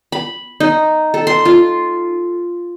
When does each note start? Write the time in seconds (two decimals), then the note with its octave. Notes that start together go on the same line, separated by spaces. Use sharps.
0.12 B5
0.60 D#4
1.14 A4
1.27 C6
1.45 F4